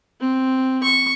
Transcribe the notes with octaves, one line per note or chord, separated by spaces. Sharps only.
C4
C#6